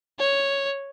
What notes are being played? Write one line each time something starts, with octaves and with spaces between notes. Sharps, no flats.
C#5